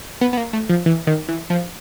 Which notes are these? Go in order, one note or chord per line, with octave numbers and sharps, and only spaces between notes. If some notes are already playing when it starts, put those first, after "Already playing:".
B3
B3
A#3
A3
F3
E3
D#3
E3
F3